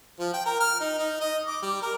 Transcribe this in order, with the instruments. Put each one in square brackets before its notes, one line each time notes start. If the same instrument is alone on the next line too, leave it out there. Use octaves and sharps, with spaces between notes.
[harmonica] F3
G5
A#4
F6
D#4
D#4
D#5
D6
G3
A#4